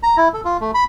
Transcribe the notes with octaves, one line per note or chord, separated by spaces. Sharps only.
A#5
E4
A4
F4
A3
B5